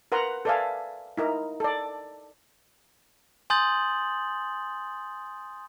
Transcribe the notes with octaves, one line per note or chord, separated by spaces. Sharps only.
A#4 B4 F#5 A#5 C6
A4 B4 D5 E5 F5 G#5
D#4 E4 A#4
A4 D5
G#5 C6 D#6 G6 A6 F#7